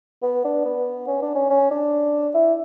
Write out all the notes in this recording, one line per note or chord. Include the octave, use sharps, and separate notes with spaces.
B3
D4
B3
C#4
D4
C#4
C#4
D4
E4